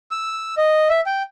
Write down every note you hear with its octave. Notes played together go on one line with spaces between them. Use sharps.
E6
D#5
E5
G5